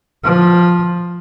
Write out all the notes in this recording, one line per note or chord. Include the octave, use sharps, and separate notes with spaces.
F3